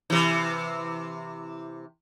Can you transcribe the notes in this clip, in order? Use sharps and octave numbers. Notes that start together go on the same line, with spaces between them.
C3 E3